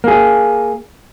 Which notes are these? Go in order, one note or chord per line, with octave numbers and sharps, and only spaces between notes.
A#3 G#4